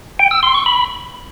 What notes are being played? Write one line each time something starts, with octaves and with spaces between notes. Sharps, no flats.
G5
E6
C6
C#6
B5